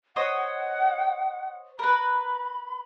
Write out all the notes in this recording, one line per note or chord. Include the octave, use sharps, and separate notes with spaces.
C5 C#5 D#5 F#5
A#4 B4 B5